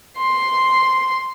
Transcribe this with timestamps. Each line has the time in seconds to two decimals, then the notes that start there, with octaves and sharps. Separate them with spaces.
0.17 C6